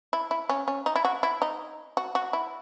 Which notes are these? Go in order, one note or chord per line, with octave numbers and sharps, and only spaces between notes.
E4
E4
C#4
C#4
D#4
E4
F#4
E4
D#4
F#4
F#4
E4